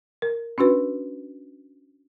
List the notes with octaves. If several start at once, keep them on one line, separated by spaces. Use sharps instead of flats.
A#4
C#4 D4 F#4 B4